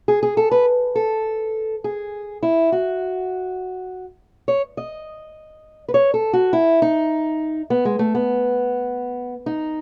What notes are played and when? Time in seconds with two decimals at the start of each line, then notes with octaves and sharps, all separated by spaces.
0.08 G#4
0.23 G#4
0.37 A4
0.51 B4
0.95 A4
1.84 G#4
2.43 E4
2.72 F#4
4.48 C#5
4.77 D#5
5.88 B4
5.94 C#5
6.14 A4
6.33 F#4
6.53 E4
6.82 D#4
7.70 B3
7.85 G#3
7.99 A3
8.15 B3
9.46 D#4